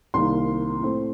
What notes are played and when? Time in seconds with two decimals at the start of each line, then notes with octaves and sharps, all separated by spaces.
0.14 C2 C3 D#3 A#3 C6
0.81 A2 A3 C4